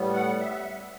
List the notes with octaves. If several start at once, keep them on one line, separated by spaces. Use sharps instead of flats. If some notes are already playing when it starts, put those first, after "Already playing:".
Already playing: A2 G3 B3
F#5
E5